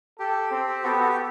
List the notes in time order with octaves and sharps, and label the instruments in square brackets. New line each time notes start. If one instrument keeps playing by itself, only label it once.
[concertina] G4 [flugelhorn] A4
[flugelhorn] C4
[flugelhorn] B3 [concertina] F#4 A4
[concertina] G4
F#4 A4
G4